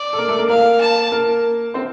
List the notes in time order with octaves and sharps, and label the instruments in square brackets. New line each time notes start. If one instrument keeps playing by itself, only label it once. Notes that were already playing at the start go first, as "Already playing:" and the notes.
Already playing: [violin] D5
[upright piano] A4
A#3 A#4
A3 A4
A#3 A#4
[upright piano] A#3 A#4 [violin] F5
[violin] A5
[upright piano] A#3 A#4
C4 C5